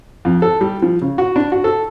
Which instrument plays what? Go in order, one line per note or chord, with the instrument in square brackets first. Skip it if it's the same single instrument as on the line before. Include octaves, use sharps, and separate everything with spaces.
[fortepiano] F2
A4
G3
F3
C#3
F#4
D4
F#4
A4